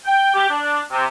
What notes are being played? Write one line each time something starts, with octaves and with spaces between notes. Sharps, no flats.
G5
G4
D4
C3